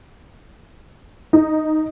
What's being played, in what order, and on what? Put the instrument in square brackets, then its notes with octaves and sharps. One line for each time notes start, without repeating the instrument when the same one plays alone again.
[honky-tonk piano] D#4